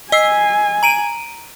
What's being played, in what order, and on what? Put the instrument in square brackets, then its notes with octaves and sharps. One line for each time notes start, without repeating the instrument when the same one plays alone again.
[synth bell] D#5 E6 C7 [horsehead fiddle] G#5
[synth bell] A#5 D7 D#7